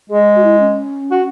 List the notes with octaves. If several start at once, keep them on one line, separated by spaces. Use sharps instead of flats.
G#3 G#4
F#4
E4
C#4
F#4